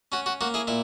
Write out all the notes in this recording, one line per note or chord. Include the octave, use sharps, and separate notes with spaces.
C#4 F#4
F#4
A#3 F#4
E4 G#4
A#2 E4